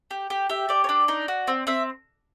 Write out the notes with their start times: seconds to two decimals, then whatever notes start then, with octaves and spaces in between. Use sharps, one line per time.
0.11 G4
0.30 G4
0.49 G4 E5
0.69 G4 D5
0.84 C#5
0.89 D4 D5
1.08 D#4
1.28 F#4
1.47 C4
1.67 C4 E5